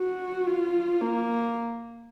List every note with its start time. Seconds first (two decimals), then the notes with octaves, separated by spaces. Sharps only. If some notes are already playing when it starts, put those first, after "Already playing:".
Already playing: F#4
0.47 F4
1.01 A#3